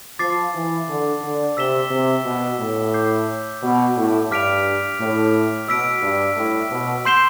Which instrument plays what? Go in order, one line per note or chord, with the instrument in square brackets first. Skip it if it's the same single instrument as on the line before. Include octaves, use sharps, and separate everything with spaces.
[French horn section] F3 [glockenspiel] D6 A6 C7
[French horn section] E3
D3
D3
[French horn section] C3 [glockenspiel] E6 B6 E7 G7
[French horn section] C3
B2
A2
[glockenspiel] D6 G6 C7
[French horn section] B2
A2
[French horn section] G2 [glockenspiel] D6 F6 B6 D7 F7
[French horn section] A2
[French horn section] B2 [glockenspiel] E6 B6 D7
[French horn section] G2
A2
B2
[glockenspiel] C6 G6 C7 E7 G7